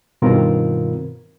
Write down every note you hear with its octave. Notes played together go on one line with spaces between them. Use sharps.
G2 B2 D#3 C4 F4 A#4